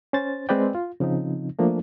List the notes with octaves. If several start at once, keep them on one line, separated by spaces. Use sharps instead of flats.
C#4 C5 A6
G#3 C4 B4 D5 G5
F4
C#3 F3 C4 D#4
F3 A3 A#3 D4